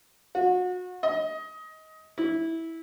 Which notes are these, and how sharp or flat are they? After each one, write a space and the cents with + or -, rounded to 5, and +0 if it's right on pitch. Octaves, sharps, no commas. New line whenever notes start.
F#4 -30
D#5 +20
E4 -15